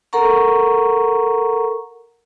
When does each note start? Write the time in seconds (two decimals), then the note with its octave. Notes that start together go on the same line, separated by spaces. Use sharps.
0.13 A4 A#4 F#5 A#5 C#6